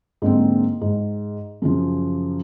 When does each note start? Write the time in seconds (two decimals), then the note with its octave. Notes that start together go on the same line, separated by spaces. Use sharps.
0.22 G#2 D3 A#3 C4
0.81 G#2
1.62 F#2 C#3 F3